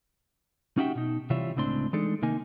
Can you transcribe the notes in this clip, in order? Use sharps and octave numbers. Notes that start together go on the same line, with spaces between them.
C#4 D#4 F#4 G4 E5 G5
B2 D#4
C3 E3 G3 F4 C#5 E5
C#2 A2 C4 D4 C6
E3 G#3 A3 D4 D#4 A4
C3 D#3 A#3 D#4 G#5